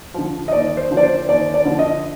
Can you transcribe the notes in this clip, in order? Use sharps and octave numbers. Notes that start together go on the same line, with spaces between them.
D3 F3
D#5
D#2 D5
C5
D3 F3
D5
C5
D#2 D5
D5
D3 F3
D#5